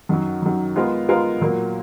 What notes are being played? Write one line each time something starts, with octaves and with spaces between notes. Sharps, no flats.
F#2 D#3 F#3
F#2 D#3 F#3
G#3 B3 F4 A#4 F5
G#3 B3 F4 A#4 F5
A#2 F#3 A#3